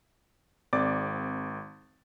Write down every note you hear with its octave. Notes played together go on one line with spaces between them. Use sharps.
G#1 C4 G#4 D5 D6 A6